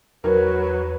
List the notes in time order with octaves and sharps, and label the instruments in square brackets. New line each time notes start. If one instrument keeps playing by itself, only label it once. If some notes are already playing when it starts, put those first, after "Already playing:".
[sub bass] E2 [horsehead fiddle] F#3 [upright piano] A#4 [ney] B4